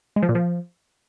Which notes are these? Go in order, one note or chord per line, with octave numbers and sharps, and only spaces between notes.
G#3
F3
A#2
F3